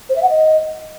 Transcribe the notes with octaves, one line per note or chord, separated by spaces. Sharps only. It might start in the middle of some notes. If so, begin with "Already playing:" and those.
C5
E5
F#5
D#5